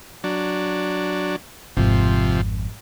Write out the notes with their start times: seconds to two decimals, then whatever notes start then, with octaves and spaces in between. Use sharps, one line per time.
0.24 F#3 D4
1.77 G#1 F2 C3 F3